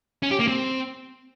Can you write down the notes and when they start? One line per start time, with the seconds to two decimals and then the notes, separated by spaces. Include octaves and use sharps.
0.23 C#4
0.31 G4
0.39 A#3
0.48 C4